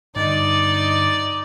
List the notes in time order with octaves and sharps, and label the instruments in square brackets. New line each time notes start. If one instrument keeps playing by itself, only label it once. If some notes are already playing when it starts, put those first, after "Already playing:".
[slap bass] G2 D3 [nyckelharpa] D#4 D#5 [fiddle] D5